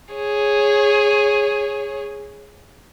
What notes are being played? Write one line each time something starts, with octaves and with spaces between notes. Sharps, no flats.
G#4 C#5